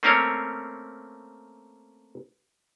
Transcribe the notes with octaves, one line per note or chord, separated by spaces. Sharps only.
A3 A#3 C4 C#4 A#4 C#5